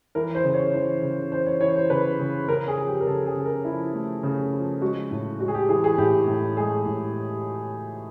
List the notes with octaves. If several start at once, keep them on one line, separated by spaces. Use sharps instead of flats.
E3 A#4
C5
C#3
C#5
E3 C5
C#3
E3 C5
C#5
E3 C#5
C5
C#3 B4
C#3
C#3 A#4
G#4
F3
G4
A#4
C#3 A4
G#4
C#3
A#4
F3 E4
A3
C#3
F3
G#3 F#4
A2
G#3 F#4
G#4
G4
E3 G#4
G#4
A2 G4
A2
G#3 G#4
A2